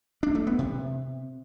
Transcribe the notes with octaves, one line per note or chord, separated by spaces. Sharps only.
D4
A3
B3
C3